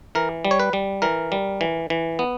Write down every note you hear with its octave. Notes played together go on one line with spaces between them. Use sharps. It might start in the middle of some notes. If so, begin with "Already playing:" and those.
E3 A#4
G3
C#5
B4
G3
E3 A#4
G3
E3
E3
B3